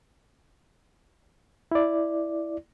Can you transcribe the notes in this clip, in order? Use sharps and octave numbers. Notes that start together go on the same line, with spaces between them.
E4 D5